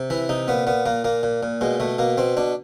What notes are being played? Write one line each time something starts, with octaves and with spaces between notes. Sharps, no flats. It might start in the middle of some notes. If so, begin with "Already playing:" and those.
Already playing: C3
E3 E4
C3 D#4
A#2 B3
A#2 B3
A#2 A#3
A#2 A#3
A#2
A#2
B2 G#3
B2 A3
B2 A#3
B2 C4
B2 D4